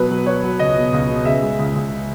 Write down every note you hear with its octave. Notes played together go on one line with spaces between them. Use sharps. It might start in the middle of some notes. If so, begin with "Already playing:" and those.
Already playing: B2 F#3 B4
F#3
F#3 C#5
F#3
C#2 D#5
B2
C#2
B2
C#3 E5
G#3
C#2
C#2